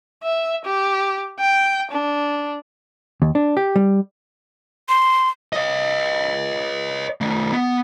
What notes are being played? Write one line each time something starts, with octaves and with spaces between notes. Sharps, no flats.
E5
G4
G5
D4
D#2
D4
G4
G3
C6
C#5 D#5
D#3 A3
B3